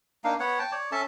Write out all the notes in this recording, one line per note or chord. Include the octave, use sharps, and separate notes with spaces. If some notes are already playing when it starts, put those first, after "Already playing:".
A#3 D4 D#4 F5
B3 C#5 F#5
G5 A5
C#5 D5
C#4 A4 E5 A5